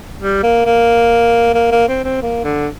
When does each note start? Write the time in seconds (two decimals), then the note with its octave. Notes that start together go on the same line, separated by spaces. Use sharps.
0.21 G3
0.43 A#3
0.65 A#3
1.54 A#3
1.71 A#3
1.88 C4
2.04 C4
2.22 A#3
2.44 D3